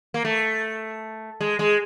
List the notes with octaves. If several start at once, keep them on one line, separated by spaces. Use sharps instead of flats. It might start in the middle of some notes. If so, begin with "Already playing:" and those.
A#3
A3
G#3
G#3